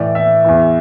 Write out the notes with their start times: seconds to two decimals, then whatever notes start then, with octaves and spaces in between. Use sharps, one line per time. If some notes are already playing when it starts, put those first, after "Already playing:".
Already playing: A2 E3 D5
0.15 E5
0.45 E2 E3